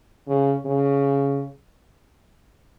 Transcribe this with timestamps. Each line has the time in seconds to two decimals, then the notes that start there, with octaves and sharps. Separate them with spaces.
0.28 C#3
0.65 C#3